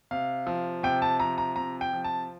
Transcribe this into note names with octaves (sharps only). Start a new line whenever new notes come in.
C3 F5
F3
C3 G5
A5
F3 A#5
A#5
C3 A#5
G5
F3
A5